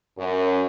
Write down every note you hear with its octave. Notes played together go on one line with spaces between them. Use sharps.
F#2